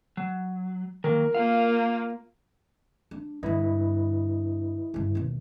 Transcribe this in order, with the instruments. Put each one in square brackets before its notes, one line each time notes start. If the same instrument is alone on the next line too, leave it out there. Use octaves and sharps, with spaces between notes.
[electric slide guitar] F#3
[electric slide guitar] D#3 F#3 A#3 [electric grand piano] A#4
[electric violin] A#3 F4 [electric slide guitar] F5
[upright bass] D4
[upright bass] G2 D3 [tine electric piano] E4 B4 D#5
[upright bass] G2 C#3
E1 D#2